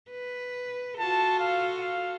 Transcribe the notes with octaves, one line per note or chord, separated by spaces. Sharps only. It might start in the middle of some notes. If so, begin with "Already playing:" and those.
B4
F4 F#4 A4 A5
F5
F5